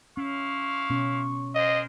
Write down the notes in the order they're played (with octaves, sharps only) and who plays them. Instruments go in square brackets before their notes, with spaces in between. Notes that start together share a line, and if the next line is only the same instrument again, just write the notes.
[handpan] C#4 [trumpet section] E4 F5 [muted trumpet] C#6
[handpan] B2 C#4
[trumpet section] G#4 A#4 C5 [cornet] D#5